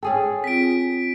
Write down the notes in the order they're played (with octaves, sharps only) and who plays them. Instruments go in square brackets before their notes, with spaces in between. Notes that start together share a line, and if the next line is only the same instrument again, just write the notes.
[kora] C#4 G#4 A4 [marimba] G5
[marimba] C4 F4 [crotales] B6 D7